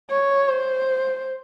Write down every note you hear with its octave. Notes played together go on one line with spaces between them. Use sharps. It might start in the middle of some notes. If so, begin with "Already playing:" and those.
C#5
C5